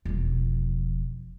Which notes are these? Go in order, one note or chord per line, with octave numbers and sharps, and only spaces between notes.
E1 F3